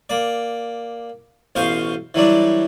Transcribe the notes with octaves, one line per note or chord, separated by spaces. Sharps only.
A#3 D5
A1 B2 C5 F5 C6 C#6
E3 F#3 G3 D4